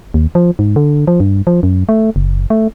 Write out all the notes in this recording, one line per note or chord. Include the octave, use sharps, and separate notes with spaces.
D#2
F3
G#2
D3
F3
G2
F3
F#2
A3
F#1
A3